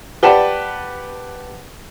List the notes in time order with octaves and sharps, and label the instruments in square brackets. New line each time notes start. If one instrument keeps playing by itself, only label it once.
[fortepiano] G4 B4 D5 F#5 A5